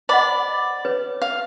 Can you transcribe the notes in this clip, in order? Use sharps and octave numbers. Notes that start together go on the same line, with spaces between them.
C5 D5 D#5 F#5 B5
B4 C#5
F5